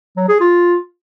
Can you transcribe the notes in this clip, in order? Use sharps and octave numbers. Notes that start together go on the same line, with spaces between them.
F#3
G#4
F4